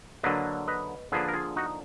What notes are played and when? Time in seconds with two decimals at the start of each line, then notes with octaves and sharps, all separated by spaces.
0.23 D3 F#3 A#3 D4 B4 D#5
0.67 B4 D#5
1.12 D3 F3 A#3 D4 G#4 B4
1.28 A#4
1.34 F4 G#4
1.56 D#4 F#4